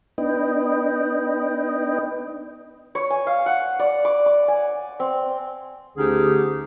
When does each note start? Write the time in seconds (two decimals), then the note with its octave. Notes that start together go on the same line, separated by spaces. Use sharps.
0.18 B3 D4 D#4 B4 D#5 G5
2.95 C#5
3.10 G#5
3.27 F5
3.46 F#5
3.79 D5
4.05 D6
4.26 D6
4.48 G#5
5.00 C4
5.97 D2 D3 C#4 D#4 G4 G#4